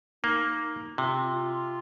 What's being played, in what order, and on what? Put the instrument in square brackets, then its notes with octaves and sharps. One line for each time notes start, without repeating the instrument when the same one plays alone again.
[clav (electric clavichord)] A#3 [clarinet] D#4
[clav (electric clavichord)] C3 [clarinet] F4
[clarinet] F4